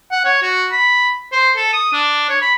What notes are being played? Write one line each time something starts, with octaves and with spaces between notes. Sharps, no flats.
F#5
C#5
F#4
B5
C5
A4
D#6
D4
C#5
B5